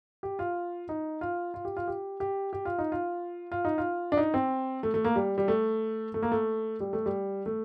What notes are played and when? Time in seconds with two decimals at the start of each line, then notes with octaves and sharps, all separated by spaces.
0.23 G4
0.39 F4
0.89 D#4
1.21 F4
1.54 F4
1.65 G4
1.77 F4
1.88 G4
2.20 G4
2.53 G4
2.65 F4
2.78 D#4
2.92 F4
3.52 F4
3.65 D#4
3.78 F4
4.12 D4
4.17 D#4
4.34 C4
4.83 A3
4.94 A3
5.04 A#3
5.16 G3
5.38 G3
5.48 A3
6.14 A3
6.22 A#3
6.32 A3
6.80 G3
6.93 A3
7.06 G3
7.46 A3